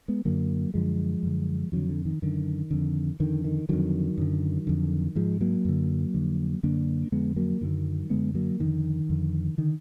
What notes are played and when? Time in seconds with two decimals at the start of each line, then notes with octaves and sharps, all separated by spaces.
0.08 G#3 B3
0.25 F#2 D3 F#3 A#3
0.74 F#2 D3 F3 G#3
1.23 F#2 D3
1.72 F2 D3 D#3 F#3
1.89 D3
2.05 D#3
2.22 F#2 D3 D#3
2.71 F2 D3
3.20 F2 D3 D#3
3.44 D#3
3.69 F2 D3 D#3 F#3
4.18 F#2 D3
4.67 F2 D3
5.15 G#2 F3 G#3
5.41 F#3 A#3
5.65 F#2 D3
6.14 F2 D3
6.63 F#2 D3 A#3 D4
7.12 F2 D3 G#3 B3
7.36 F#3 A#3
7.61 F#2 D3 D#3 F#3
8.10 F#2 D3 G#3 B3
8.35 F#3 A#3
8.60 F2 D3 D#3
9.09 F2 D3
9.58 D3 D#3